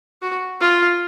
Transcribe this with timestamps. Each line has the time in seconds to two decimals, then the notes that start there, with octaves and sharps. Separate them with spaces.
0.22 F#4
0.61 F4